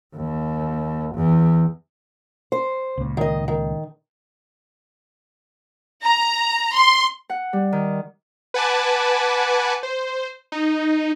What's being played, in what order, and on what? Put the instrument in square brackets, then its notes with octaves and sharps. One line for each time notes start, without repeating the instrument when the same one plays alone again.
[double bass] D#2
E2
[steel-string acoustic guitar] C5
[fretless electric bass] C#2 A#2
[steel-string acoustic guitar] D#3 D#5
D#3
[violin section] A#5
C6
[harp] F#5
G3
D#3
[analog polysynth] B4 F#5 G#5 A5 D6
C5
D#4